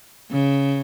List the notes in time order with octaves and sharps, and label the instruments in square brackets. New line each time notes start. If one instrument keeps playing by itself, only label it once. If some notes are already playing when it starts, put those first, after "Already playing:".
[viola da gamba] C#3